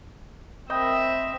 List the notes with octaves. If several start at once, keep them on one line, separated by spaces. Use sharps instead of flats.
C4 D#5 E5 G5 B5